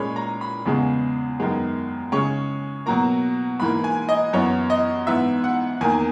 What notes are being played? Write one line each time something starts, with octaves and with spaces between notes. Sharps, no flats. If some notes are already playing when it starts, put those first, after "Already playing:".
Already playing: A#2 G#3 C#4 B5
A#5
B5
E2 C#3 G#3 B3
F#2 D#3 G#3 B3
C#3 G#3 C#4 C#6
B2 F#3 A#3 A#5
G#2 E3 A#3 B5
G#5
D#5
F#2 E3 B3 C#5
D#5
G#2 E3 B3 E5
F#5
E2 D#3 A#3 G#5